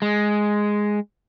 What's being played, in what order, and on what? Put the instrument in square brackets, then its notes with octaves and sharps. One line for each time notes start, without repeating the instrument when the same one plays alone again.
[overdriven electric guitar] G#3